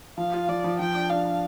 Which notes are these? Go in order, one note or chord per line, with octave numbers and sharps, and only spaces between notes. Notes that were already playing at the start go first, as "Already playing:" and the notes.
F3 F5
F4
F3 D5
F3
F3 G5
D4
D4 F5
D4